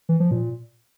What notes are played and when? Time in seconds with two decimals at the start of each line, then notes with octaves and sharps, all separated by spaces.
0.09 E3
0.20 F3
0.31 A#2